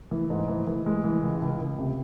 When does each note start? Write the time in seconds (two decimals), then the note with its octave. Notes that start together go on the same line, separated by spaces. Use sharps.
0.11 E3
0.30 G#2
0.48 E3
0.67 E3
0.86 G#3
1.04 E3
1.23 C#2
1.42 C#2
1.61 C#2
1.78 C3